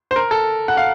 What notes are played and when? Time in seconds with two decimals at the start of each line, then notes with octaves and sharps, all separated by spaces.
0.11 C5
0.16 A#4
0.31 A4
0.68 F#5
0.77 F5